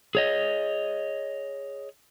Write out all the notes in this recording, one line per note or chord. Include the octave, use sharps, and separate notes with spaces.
G#4 C#5 D#5